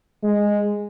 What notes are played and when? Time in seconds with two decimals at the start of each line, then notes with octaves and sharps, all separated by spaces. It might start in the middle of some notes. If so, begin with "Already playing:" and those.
0.23 G#3